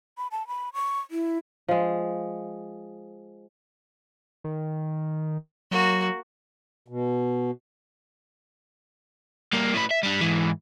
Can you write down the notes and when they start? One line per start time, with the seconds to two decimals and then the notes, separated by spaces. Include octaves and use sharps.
0.18 B5
0.31 A5
0.48 B5
0.74 C#6
1.11 E4
1.68 F3 G#3
4.44 D#3
5.71 F#3 A#3 F#4
6.88 B2
9.53 G2 A#3
9.74 A2 B4
9.91 E5
10.03 G3 D4
10.21 G#2 E3